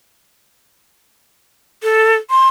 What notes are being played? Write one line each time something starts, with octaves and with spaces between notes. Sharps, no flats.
A4
C6